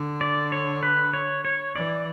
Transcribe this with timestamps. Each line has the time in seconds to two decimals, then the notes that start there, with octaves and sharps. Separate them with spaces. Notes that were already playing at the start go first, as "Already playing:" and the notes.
Already playing: D3
0.21 D5
0.52 C#5
0.83 B4
1.13 C#5
1.45 C#5
1.75 E3 D5